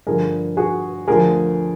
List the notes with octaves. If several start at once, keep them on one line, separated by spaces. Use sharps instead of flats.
G2 D3 F3 G#4 A#4
F#4 G#4
D2 D3 F3 G#4 A#4